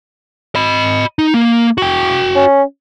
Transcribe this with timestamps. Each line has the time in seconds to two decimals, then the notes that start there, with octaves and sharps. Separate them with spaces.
0.55 D#5 B5
1.19 D#4
1.34 A#3
1.78 F#4 G5
2.35 C#4